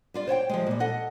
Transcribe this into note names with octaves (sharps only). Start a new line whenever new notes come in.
G3 F4 D5
C5 C#5 F#5 G5
F3 G3 G#3
A#2 G3
A4 D#5 F#5